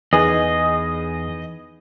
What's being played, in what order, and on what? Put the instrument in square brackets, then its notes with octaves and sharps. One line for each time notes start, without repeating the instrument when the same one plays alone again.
[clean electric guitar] E2 [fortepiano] D#4 G#4 B4 [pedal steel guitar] D#5